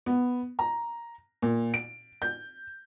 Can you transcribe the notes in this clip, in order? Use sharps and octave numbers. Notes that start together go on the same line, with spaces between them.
B3
A#5
A#2
D7
G6